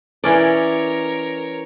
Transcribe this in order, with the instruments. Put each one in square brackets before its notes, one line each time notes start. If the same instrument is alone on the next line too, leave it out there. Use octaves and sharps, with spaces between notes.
[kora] E3 C#4 D5 [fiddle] A#4 C#5